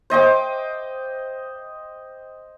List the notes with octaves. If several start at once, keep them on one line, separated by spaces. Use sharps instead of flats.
C5 D#5 G5 D6